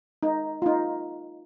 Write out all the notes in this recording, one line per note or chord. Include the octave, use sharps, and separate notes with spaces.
D#4
F4
D#4